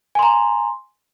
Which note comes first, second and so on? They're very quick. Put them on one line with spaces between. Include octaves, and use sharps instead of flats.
G#5 C6 A#5